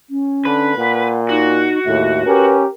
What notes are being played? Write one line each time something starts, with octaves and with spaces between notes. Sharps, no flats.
C#4
D3 B4
A#2 F#5
D#4 F#4
D#2 A2 E5
C#4 G4 A#4 B4